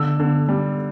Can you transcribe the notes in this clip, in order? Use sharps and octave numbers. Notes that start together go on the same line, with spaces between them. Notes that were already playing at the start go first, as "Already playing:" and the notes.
Already playing: D3 E6
D3
G3